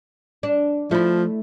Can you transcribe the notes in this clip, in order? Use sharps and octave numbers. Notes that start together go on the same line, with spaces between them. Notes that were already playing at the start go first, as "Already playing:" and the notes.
D4
F3 A3 E4